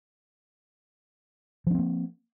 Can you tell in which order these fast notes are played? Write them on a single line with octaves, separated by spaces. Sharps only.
F3 C#4 C4 A#3